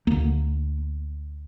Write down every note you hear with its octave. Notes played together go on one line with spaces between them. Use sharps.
D2 D3 A#3